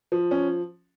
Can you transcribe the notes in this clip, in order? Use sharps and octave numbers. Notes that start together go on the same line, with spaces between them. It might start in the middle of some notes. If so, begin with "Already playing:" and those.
F3
C#4